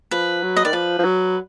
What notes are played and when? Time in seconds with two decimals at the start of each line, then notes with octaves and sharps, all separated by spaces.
0.11 F3 B4
0.43 F#3
0.56 D#5
0.65 D#3 D5
0.73 F3 B4
0.99 F3
1.05 F#3